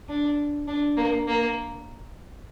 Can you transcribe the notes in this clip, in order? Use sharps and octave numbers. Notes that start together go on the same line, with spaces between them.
D4
D4
A#3
A#3